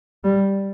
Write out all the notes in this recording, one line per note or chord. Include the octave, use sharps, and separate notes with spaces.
G3